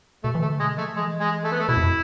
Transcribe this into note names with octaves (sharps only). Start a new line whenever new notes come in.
B2 A3
E3
D3 A3
B2 G#3
F3 A3
E3 G#3
G#3
A3
B3
A3
B2 E4
F2